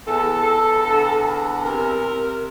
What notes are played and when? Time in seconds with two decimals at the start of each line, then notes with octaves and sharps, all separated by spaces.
0.07 E2 A4
0.46 E2
0.85 D3
1.24 E2
1.64 C3 A#4
2.03 C3